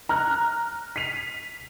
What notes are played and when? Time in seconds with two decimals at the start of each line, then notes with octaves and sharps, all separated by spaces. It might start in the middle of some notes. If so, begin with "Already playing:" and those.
0.09 A#5 F6 F#6
0.96 B6 C7 D#7 F7